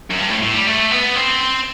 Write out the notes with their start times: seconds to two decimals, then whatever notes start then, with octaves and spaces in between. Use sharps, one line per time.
0.11 F#2
0.19 G2
0.30 A2
0.42 A2
0.54 G3
0.67 A3
0.91 B3
1.15 C4